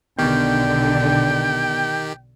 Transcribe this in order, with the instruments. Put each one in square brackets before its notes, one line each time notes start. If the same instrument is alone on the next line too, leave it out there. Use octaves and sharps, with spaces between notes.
[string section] B1 D3 [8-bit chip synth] D#3 G4 [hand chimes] B3 [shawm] G5